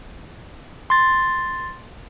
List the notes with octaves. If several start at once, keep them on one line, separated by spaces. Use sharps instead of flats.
C6 A6